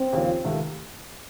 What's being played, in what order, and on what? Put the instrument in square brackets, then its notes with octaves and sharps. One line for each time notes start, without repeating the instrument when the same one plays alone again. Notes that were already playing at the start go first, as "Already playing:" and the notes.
Already playing: [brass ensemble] C4
[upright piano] D#2 C#3 F3
C#2 C3 D#3 A3